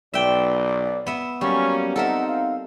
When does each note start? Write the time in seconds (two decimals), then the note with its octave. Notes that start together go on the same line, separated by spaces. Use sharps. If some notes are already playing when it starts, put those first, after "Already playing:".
0.14 B1 D5 E5 G5
1.06 B3 E5
1.41 F#3 G3 A#3 C#4 C#6
1.96 C4 D#4 A4 A#4 E5 F#5
2.28 F5